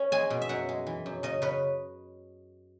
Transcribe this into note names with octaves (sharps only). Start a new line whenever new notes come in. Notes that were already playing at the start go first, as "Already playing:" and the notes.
Already playing: C#4
G#3 G#5
B2
E5
F#2 F#5
G#3
E3
F#2
C#3 D#5
C#3 B4